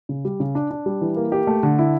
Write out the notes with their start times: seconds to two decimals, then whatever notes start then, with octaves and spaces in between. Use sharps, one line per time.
0.09 C#3
0.25 G3
0.40 C#3
0.55 D4
0.71 D4
0.86 G3
1.01 E3
1.16 A#3
1.32 G4
1.47 A3
1.63 D3
1.79 E4